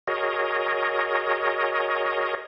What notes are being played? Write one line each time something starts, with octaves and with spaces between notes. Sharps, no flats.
F#4 G#4 A#4 C#5 D#5